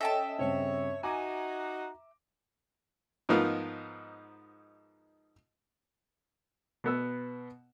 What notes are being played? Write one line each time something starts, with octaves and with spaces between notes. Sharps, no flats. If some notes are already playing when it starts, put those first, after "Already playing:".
C#4 A4 D#5 E5 G5 A5
G2 C#3 C4 C#5
D#4 F#4 G#5 A#5 D6
G#2 F3 B3 D#4 F4 A#4
B2 B3 E6